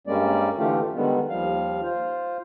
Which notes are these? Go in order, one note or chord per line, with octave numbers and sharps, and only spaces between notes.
G2 G3 G#3 A#3 C#4 D5
D3 E3 A3 F4 G4
D3 D#3 G3 G#3 B3
D#2 F3 G3 F5
F4 C5